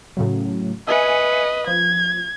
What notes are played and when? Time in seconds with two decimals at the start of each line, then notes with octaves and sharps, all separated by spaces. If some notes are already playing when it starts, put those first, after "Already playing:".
0.17 A2 C#3 F#3
0.87 B4 D#5 E5 G#5 C#7
1.67 F3 G#6